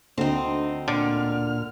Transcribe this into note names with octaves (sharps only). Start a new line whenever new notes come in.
D2 C4 D#4
A#2 D3 F6